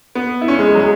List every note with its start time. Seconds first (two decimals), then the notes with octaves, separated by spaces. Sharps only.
0.15 B3
0.41 E4
0.48 C#4
0.59 G#3
0.69 G#3
0.75 F#3
0.80 G#3